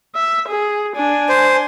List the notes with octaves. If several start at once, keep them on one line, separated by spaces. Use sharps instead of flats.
E5
G#4
D4 G#5
C5